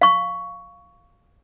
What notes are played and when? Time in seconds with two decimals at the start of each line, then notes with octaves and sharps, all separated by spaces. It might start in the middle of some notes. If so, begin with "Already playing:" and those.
0.01 F5 C#6